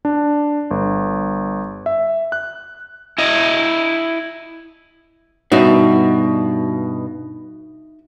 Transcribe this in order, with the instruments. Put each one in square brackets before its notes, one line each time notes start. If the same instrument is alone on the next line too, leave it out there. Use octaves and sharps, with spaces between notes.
[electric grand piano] D4
G1
E5
F#6
[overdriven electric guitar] E4 D#5
[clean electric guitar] G2 B2 [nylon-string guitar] D#4 F#4 E5